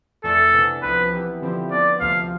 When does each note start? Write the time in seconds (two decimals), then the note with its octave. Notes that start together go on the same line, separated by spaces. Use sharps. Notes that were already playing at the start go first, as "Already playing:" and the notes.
0.24 F2 E3 A3 D4 A4
0.53 C3 E3 B3 D4
0.83 C2 C3 F3 B3 B4
1.12 C3 E3 B3 E4 G4
1.42 D3 F3 C4 E4 G4
1.70 F3 B3 D4 D5
2.01 D2 C3 F3 F5